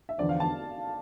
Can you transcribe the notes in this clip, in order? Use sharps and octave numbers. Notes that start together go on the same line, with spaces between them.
E5
E2 D3 F3 D5
F5
A5